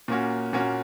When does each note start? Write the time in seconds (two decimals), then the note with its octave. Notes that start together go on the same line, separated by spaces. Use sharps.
0.08 A#2 A#3 C#4 F#4
0.53 A#2 A#3 C#4 F#4